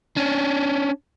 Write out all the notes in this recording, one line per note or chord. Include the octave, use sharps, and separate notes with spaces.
C#4 D4